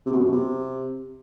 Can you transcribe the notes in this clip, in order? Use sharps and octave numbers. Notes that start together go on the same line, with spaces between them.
C3
B2
F#2
B2
C3